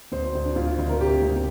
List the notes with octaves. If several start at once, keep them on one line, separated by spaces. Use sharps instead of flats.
D2 C5
D2
D4
D2 F4
D2
A#4
C3 G4
D2